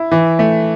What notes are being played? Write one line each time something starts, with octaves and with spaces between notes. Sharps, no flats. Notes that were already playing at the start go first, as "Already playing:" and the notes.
Already playing: E4
E3
A3